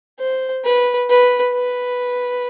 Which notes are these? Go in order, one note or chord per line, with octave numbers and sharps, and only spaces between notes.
C5
B4
B4
B4